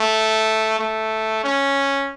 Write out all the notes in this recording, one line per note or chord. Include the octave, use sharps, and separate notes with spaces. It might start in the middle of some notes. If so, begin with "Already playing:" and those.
Already playing: A3
A3
C#4